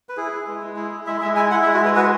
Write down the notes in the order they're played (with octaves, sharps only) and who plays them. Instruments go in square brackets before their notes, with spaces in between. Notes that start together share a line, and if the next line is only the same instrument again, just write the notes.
[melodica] B4
E4 G#4
E4
G#3
G#3
E4
E4
G#3 E5
G#3 E5
E4 G#5
E4 F#5
E5
G#3
F#4
G#3 B4
F#4 B4